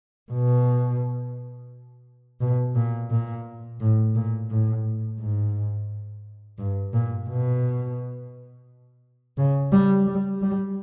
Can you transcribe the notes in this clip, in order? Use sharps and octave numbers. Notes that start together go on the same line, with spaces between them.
B2
B2
A#2
A#2
A2
A#2
A2
G#2
G2
A#2
B2
C#3
G3
G3
G3